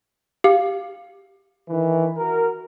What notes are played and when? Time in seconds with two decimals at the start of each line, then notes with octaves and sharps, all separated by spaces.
0.44 G4 F5
1.68 D#3 E3
2.17 F#4 A#4